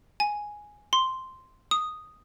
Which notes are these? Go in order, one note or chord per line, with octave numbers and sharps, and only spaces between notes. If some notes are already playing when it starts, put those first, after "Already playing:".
G#5
C6
D#6